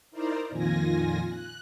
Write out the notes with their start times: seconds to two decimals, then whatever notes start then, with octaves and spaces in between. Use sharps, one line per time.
0.11 D#4 E4 A#4 C5 D5 A#5
0.50 F2 A#2 D#3 F4 G#5 A#6
1.30 F#6